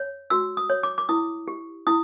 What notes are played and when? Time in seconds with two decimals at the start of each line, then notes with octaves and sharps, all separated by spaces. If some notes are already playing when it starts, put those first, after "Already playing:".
Already playing: C#5
0.30 F#4 E6
0.57 D#6
0.70 C#5
0.83 D6
0.98 D6
1.09 E4 D#6
1.48 G4
1.87 E4 D#6